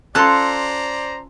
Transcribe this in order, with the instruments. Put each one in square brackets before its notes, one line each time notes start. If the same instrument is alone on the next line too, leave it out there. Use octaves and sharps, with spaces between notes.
[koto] C#4 F4 A4 [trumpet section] C5 D5 A#5 [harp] C6 F#6